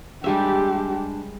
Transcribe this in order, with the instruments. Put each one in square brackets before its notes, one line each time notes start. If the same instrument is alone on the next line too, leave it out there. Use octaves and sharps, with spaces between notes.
[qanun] G3 G#3 E5 [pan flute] D4 [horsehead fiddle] G4